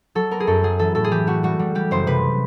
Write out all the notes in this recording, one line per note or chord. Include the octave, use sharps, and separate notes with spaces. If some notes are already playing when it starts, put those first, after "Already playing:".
F#3 A4
B3 A#4
G#4
F#2 A4
F#3 G#4
E3 A4
A2 A4
G#4
E3 G4
A3 F#4
G3 F#4
G3
G3 G4
F#1 C5
C3 B4